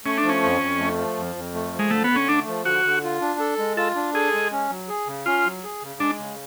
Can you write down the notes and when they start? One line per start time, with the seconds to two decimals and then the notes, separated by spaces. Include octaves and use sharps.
0.05 A3 C#4
0.18 D4
0.23 F3
0.29 C#4
0.43 F2
0.61 F2
0.79 A3
0.98 F3
1.17 F2
1.36 F2
1.54 A3
1.73 F3
1.79 G#3
1.91 D3 A3
2.04 B3
2.10 D3
2.16 C#4
2.29 A3 D4
2.47 F3
2.65 D3 F#4
2.84 D3
3.03 F4
3.21 D4
3.40 A4
3.58 G#3
3.77 F4 A4
3.95 D4
4.14 G#4 A4
4.33 G#3
4.52 C#4
4.70 F#3
4.88 G#4
5.07 C#3
5.26 C#4 F4
5.45 F#3
5.64 G#4
5.82 C#3
6.00 G#3 D4
6.18 C#3